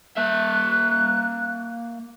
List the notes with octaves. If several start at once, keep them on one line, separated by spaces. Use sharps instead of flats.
A#3 E5 F#6